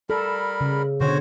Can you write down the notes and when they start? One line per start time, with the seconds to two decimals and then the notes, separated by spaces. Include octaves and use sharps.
0.10 G3 A4 A#4 B5
0.61 C#3
1.00 B2 D3 F#4 C5 C#5